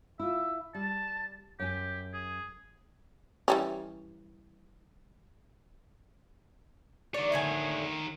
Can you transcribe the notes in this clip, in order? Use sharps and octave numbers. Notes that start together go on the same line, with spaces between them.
E4 F4 E5
G3 A5
F#2 G4 G#5
G#4
E3 G3 C#4
D#3 C#5 D5
A2 D3 G#5